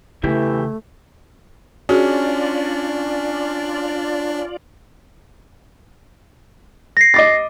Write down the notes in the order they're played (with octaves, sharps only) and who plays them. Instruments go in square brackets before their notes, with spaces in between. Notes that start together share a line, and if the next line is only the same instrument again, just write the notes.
[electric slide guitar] E2 E4 G4 [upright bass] C#3 [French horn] E3 [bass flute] A3
[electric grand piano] C#4 [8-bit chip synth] D4 [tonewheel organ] F4 D5 [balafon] F#4 G#4
[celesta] A#6 C7
[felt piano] D#5 D6 A6